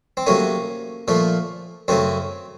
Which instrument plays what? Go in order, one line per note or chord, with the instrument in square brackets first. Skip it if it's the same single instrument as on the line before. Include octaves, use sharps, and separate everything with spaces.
[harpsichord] C4
C3 F#3 A3 A#3 C#4
A#2 F3 A3
F#2 C#3 A3 C4